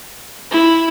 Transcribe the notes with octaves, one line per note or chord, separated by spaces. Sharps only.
E4